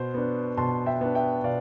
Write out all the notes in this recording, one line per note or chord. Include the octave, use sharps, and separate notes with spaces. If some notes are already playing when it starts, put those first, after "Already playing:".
Already playing: B2 C5
B3 D4
B2 A5 C6
E5 G5
B3 D4
E5 G5
B2 D5 F5